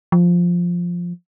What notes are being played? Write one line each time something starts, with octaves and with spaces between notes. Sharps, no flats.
F3